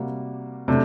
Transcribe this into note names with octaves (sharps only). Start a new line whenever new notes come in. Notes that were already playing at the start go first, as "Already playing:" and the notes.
Already playing: C3 G3 A#3 F#4
C3 F#3 A3 D4